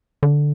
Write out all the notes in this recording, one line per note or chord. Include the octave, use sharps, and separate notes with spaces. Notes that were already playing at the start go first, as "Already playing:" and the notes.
D3